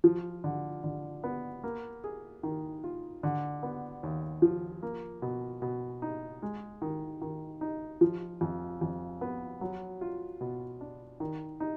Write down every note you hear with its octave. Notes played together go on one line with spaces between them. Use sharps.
F3
D3
D3
B3
A#3
G#4
D#3
F4
D3
B3
D#2
F3
A#3
B2
B2
D#4
G#3
D#3
D#3
D#4
F3
F2
F2
B3
F#3
F4
B2
D4
D#3
D#4